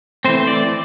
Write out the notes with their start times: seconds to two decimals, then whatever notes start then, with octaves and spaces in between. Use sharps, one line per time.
0.25 E3 A3 C4 C5
0.47 D5